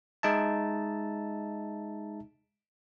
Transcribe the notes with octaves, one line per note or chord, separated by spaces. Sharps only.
G#3 D#4 E5 A5